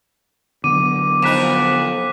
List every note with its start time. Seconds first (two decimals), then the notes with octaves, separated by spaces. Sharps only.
0.64 D3 F#3 B3 D6 D#7
1.22 F2 D#4 F#6 B6 E7